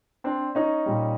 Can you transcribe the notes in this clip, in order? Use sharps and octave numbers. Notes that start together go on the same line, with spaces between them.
C4 D4
C#4 D#4
A#2 G3